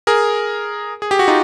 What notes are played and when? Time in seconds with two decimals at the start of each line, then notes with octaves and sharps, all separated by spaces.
0.07 G#4 A#4
1.02 G#4
1.11 G4
1.19 F#4
1.28 D#4 F4